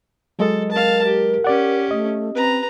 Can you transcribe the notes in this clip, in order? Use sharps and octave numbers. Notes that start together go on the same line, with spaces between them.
F#3 G#3 A4 D#5
A#4 F5 A5
G4
C#4 G4 D5 F#5
A3 D#5
C4 B4 A#5